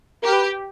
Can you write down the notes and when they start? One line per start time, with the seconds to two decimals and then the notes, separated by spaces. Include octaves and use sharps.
0.22 G4 A#4
0.33 B4